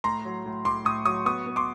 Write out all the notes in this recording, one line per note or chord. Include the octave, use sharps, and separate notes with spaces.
A2 A#5 C6
F#3
A2
A2 C6 D6
A2 C#6 D#6
F#3 C#6 D#6
B3 C#6 D#6
B3
C6 D6